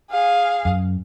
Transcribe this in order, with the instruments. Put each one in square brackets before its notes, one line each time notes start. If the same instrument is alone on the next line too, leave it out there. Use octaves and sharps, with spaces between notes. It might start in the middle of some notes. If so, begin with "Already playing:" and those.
[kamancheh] G#4 F5
[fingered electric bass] F#2